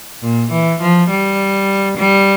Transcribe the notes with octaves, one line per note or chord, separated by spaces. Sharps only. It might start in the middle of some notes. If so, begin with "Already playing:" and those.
A#2
E3
F3
G3
G3